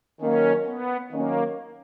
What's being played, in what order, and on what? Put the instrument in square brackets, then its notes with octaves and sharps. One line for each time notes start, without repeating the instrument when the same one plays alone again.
[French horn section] D#3 F#3 A#3 [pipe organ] C#4
[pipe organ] B3
[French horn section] D#3 F#3 C#4 [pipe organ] A#3